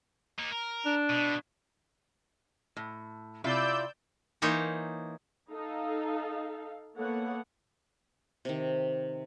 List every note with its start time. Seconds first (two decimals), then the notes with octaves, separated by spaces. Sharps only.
0.39 A#3 D#4
0.52 A#4
0.85 D4
1.10 B2
2.77 A2
3.44 C3 E4 F4 D5 E6 G6
4.42 E3 A#3 D#4 C5 C#5
5.51 D#4 A4 F5
6.96 A#3 B3 A4 C#5 F#5
8.45 C3 D#3